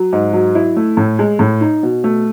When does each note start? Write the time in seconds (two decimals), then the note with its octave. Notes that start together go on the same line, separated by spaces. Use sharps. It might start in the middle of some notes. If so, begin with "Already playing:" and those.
Already playing: F#3
0.13 G#2
0.33 F#3
0.55 E4
0.77 A3
0.97 A2
1.19 G#3
1.39 A2
1.61 D#4
1.83 B2
2.04 A3